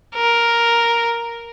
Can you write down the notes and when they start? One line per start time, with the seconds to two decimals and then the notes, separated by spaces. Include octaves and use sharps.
0.14 A#4